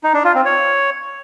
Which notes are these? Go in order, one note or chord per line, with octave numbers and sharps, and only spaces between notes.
D#4
D4
F4
C4
C#5